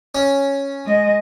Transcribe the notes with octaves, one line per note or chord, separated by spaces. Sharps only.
C#4
G#3 D#5